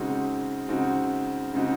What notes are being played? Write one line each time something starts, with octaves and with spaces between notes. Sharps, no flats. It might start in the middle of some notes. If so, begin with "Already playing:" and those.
Already playing: C#3 G#3 C4 D#4 F#4
C#3 G#3 C4 D#4 F#4
C#3 G#3 C4 D#4 F#4